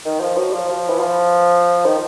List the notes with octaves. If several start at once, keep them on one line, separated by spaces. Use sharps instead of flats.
D#3
F3
F#3
F3
F3
E3
F3
D#3